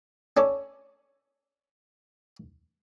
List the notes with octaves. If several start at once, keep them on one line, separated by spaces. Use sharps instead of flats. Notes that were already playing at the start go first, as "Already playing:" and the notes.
C#4 A4 C#5 D5